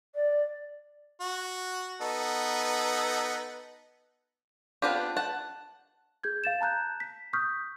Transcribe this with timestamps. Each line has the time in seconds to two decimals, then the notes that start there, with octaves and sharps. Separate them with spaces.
0.15 D5
1.21 F#4
2.01 B3 D#4 A4
4.82 B3 C4 D4 F4 G4
5.17 F#5 A5
6.24 G#4 G6 G#6
6.44 F5 A6 E7
6.61 A5 A#5 F#6 G6
7.00 B6
7.33 C#6 D#6 F6 G6 B6